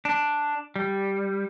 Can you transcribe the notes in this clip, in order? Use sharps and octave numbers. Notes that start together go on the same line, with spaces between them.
D4
G3